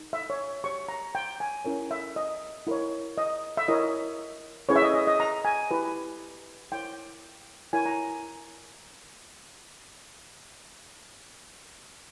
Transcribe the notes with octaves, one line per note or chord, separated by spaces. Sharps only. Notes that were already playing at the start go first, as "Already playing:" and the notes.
Already playing: D#4
E5
C#5
G4 C#5 C#6
A#5
G5
G#5
C#4 E4 A#4 C#5
E5
D#5
E4 A#4 C#5
D#5
E5
E4 A#4 C#5 D#5
C#4 E4 G#4 B4 C#5
E5
D#5
D#5
D#5
A#5
G#5
E4 G4 B4
E4 A#4 C#5 G5
E4 A#4 C#5 G#5
A#5